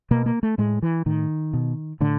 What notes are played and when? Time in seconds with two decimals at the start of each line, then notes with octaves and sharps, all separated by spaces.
0.11 B2 A#3
0.26 A#3
0.43 A3
0.58 A2 G#3
0.82 E3
1.06 A2 D#3
1.53 B2
2.01 A2 D3